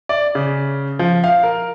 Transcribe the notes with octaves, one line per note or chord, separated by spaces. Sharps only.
D5
C#3
F3
F5
A#4